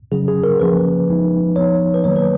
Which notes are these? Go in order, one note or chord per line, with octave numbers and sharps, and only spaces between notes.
C#3 F#3 C#4 G#4
G#4
A#4
C#3 F3 A#3 C#4 B4
F3 G#3 B3 D#4
F3 B3 D#4 C#5
B4
D#3 F#3 A#3 C#5
B4